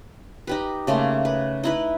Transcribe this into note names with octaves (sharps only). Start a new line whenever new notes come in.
D#4 G4 B4
C#3 A3 A#3 C6
B4
D#4 E4 B4